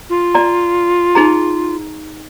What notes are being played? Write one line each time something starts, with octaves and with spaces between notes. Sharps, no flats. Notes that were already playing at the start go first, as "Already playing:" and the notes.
F4
D5 A#5
D#4 G#4 A#5